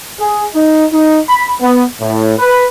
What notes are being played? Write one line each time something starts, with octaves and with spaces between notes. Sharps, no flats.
G#4
D#4
D#4
B5
B3
A2
B4